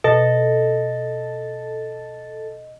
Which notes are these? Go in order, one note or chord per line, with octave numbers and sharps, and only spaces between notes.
B2 A4 D#5